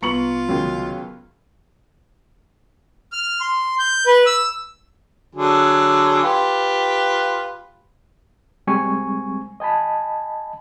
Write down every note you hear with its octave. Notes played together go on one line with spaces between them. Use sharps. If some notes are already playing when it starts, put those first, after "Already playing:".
C2 B3 F4 A#5 B5 C#6 C#7 F#7
C#2 D#3 F#3
F6
C6
G6
B4
E6
D3 F#3 G#4
F4 G4 B4
C2 G3 G#3 C4 G#5 C#6
D#5 G#5 A5 B5